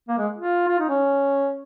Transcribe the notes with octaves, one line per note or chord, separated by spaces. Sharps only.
A#3
G#3
F4
F4
D#4
C#4